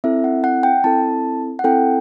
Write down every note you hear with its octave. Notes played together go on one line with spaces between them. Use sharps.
C4 E4 A4 E5
F#5
F#5
G5
C4 E4 A4 A5
F#5
C4 E4 A4 G5